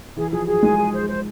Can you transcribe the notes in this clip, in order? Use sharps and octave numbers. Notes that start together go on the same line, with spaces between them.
E3 G#4
F3 G#4
F#3 G#4
G#3 G#5
G#4
C5
C5